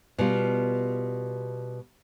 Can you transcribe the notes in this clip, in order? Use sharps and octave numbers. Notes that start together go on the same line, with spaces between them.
B2 G3 F4